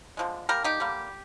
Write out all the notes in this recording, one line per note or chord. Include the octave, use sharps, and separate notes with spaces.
D3 F3 G#3
D3 G3 A#3 G4 A#4
D#4 G4
D3 G3 A#3